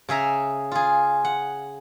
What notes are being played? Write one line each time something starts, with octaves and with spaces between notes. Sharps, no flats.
C#3 G#4 E5 A#5
F4 G#4
F#5